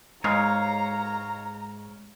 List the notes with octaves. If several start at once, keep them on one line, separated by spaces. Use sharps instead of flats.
G#2 G#3 C#5 F5 A#5